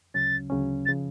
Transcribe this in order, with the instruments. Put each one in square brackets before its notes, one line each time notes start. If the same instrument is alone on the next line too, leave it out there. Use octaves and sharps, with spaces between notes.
[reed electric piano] D2 C#3 F#3 C#4 [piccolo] A6
[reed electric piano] D2 C#3 F#3 C#4
[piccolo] A6
[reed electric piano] C#3 F3